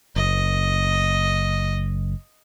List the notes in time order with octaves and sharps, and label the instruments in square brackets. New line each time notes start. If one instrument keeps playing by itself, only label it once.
[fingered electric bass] F#1 [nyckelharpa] D#5